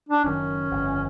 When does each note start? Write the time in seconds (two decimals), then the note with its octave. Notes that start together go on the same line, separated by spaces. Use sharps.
0.09 D4
0.24 F#1 F#2 D#3 C#4
0.71 G1 F2 C#3